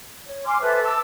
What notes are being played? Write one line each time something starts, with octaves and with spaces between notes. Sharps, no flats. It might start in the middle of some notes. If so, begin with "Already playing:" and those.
C#5
G#5 C6 D6 F6
A4 B4 C5 E5
A5 D6 E6